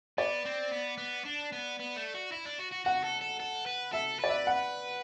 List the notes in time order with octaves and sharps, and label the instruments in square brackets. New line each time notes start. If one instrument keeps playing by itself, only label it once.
[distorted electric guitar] B3 [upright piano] D5
[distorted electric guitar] C4
B3
B3
D4
B3
B3
A3
F#4
E4
D4
F#4
F#4
[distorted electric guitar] F#4 [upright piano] F#5
[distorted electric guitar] A4
A4
A4
B4
[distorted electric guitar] A4 [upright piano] E5
[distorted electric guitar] B4 [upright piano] D5
[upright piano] E5
F#5